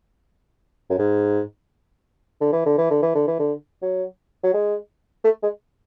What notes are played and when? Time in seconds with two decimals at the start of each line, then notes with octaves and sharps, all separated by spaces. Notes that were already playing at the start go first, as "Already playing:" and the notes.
0.90 F#2
0.99 G#2
2.41 D3
2.53 E3
2.66 D3
2.78 E3
2.90 D3
3.03 E3
3.15 D3
3.27 E3
3.39 D3
3.82 F#3
4.44 F#3
4.54 G#3
5.24 A3
5.43 G#3